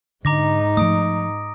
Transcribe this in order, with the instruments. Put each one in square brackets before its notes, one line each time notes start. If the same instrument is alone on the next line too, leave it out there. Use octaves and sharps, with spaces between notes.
[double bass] G#2 D#4 [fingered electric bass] D3 [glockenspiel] A#5 D6 A#6
[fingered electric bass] F3 A3 [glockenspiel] D#6 D7